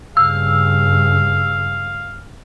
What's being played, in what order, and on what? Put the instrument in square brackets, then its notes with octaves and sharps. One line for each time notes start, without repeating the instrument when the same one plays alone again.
[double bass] G2 C#3 [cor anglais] F5 [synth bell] E6